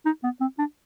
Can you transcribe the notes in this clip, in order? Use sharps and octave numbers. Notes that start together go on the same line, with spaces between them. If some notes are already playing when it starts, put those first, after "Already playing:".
D#4
B3
C4
D4